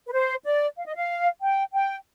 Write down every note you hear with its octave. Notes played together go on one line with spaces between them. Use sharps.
B4
C5
D5
F5
D#5
F5
G5
G5